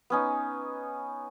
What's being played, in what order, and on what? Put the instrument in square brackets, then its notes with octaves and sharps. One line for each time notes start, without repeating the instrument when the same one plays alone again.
[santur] B3 C#4 D#4